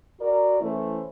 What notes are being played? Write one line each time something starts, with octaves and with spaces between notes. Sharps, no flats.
F#4 A#4 D5
E3 A3 C#4 E4 C5 C#5